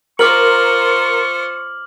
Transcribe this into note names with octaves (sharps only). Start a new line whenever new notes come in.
F4 A#4 C5 C#6 D6 F6 F#7